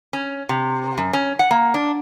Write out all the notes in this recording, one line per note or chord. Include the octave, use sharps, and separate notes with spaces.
C#4
C3
F#2
C#4
F#5
A#3
D4